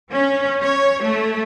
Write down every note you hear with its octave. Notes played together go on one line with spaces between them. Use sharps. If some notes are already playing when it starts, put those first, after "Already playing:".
C#4
C#5
A3